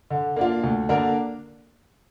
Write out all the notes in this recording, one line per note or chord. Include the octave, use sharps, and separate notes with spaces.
D3
A#3 D4 F4
D2
D3 A#3 D4 A#4